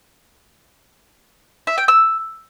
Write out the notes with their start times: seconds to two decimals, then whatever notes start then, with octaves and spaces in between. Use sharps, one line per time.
1.67 E5
1.78 G5
1.88 E6